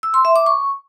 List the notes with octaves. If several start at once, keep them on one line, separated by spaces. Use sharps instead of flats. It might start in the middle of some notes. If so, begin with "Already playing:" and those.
E6
C6
E5
D6
C#6